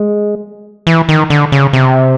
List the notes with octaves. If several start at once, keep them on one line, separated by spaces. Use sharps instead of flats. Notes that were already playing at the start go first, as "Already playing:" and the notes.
Already playing: G#3
E3
D#3
D3
C#3
C3